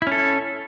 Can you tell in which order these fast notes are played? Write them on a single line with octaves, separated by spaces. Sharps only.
E4 C#4 A4